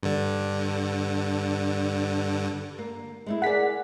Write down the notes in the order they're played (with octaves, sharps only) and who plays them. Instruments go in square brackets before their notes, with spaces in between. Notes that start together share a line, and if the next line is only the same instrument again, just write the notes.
[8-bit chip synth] G2 D3
[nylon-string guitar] A#3
G#3 A3 E4
[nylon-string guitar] G#4 A#4 D5 [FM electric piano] F#5 B6